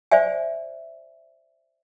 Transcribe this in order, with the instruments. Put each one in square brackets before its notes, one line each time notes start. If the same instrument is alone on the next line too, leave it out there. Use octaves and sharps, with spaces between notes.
[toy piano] C5 D5 E5 G#5